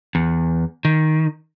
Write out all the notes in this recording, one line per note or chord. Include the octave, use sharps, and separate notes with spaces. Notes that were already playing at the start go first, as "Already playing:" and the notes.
E2
D#3